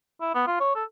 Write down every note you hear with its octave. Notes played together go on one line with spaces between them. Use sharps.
E4
B3
F4
C#5
A4